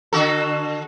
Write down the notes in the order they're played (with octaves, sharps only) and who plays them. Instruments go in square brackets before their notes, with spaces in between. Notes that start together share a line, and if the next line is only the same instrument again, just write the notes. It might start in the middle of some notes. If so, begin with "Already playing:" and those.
[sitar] D3 F#4 A4